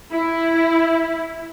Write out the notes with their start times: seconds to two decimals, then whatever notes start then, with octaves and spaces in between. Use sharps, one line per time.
0.11 E4